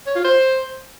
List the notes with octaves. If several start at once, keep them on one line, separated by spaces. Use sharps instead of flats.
C#5
F4
C5